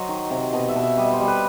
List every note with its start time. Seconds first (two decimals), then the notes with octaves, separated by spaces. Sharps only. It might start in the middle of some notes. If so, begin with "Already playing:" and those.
Already playing: F#3 C5 D#5
0.09 D#3
0.30 C3
0.53 B2 D#5
0.68 E5
0.76 B2
0.83 E5
0.97 G3 D#5
1.12 C5
1.21 G3
1.28 B4